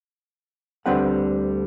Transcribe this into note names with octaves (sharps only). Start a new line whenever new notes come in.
D2 D3 G3 C4 B4 F#5